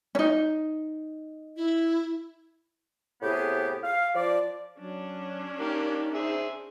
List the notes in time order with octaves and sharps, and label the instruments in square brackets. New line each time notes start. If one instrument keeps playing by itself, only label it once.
[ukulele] C#4 D#4
[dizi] E4
[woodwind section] A2 C3 B3 G4 G#4
F5
F3 D5
[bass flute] F#3 [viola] C#4 D4
[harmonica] A#3 G4 [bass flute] D#4
[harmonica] G#4 C5 E5